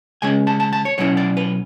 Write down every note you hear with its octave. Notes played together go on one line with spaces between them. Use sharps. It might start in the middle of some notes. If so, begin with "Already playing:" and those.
C#3 G#3 C#4 G#5
A5
A5
A5
C#5
B2 F#3 C#4 E4 C#5
D5
B4